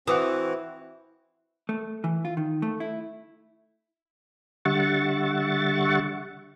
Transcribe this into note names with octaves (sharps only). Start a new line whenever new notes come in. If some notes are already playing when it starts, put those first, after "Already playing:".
E3 C4 F#4 F#5 D6 D#6
A3
E3
F4
D#3
A3
E4
D3 G3 E5 F#5 C#6 A6